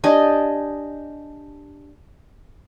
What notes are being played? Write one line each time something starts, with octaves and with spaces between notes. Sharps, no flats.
D4 G4 D#5 G#5